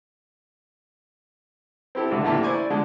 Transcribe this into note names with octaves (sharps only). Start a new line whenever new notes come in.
C4 E4 G4 A4
C#2 D3 F4 F#4 A4 E5
A1 D3 E3 A3 A#3 G4
E4 C5 D5 G#5 C#6 D6
D5
D3 F3 G#3 G#4